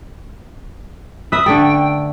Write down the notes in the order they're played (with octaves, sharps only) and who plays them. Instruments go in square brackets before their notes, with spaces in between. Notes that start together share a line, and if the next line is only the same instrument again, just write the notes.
[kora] B4 E5 [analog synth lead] D#6
[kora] D3 A3 A4 [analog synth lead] G5